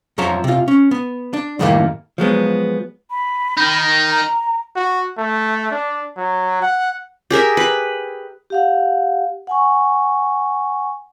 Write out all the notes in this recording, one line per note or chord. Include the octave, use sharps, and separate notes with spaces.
F2 F3 F#3 C#5 E5 A#5
C3 F4
C#4
B3
D4
F#2 A2 D#3 G3 A3 A#3
F3 F#3 G#3 B3
B5
D#4 A#4
A#5
F#4
A3
D4
F#3
F#5
G4 G#4 A#4 E5
B4
G4 F5 F#5
F#5 G#5 C#6